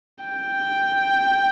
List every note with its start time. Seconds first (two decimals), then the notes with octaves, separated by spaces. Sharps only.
0.25 G5